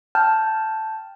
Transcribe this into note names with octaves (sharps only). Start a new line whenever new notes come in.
G5 A5 F6 G6